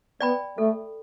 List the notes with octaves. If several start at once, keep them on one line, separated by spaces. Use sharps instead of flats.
B3 D5 G5 B5
A3 A4